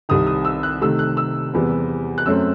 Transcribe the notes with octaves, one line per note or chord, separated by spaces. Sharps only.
C2 C3 D#3 D#6
D#6
E6
F#6
C3 D#3 A3 E6
F#6
E6
E2 C3 E3 G3 B3
F#6
F#2 F#3 A3 C4 E6